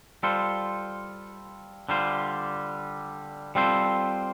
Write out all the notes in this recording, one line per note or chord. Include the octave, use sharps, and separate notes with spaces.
G3 F4 A4 C5
D3 G3 F4 C5
G3 C4 F4 A4 C5